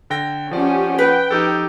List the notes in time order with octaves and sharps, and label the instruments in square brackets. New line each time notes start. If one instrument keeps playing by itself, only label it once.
[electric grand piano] D3 G5 A#6
[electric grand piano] F3 D5 [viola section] C#4 G4 [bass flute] F#5
[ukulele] B4 [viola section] G5
[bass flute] F3 [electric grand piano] D#4 G4 A4